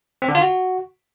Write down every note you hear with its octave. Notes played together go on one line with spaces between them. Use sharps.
C4
D3
F4
F#4